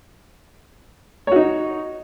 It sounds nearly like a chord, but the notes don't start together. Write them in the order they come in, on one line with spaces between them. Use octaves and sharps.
C#5 F#4 D#4